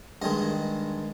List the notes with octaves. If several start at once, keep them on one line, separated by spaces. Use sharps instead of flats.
G2 D#3 G#3 D#5